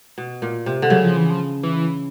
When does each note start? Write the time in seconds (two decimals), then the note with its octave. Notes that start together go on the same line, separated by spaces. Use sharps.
0.18 B2
0.42 A#2
0.66 C3
0.82 D3
0.90 C#3 F#3
1.04 F3
1.17 E3
1.30 F3
1.63 E3